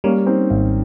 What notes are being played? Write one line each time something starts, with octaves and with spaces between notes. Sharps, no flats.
G3 A#3 C#4
C4 D#4
G#1